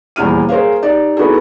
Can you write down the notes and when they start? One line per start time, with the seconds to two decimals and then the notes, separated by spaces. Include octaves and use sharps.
0.16 D#1 E2 E4 F6 D#7
0.49 G#4 A#4 C5 C#5 F5
0.82 D#4 G4 D5
1.17 B3 D#4 E4 F#4 G#4 A4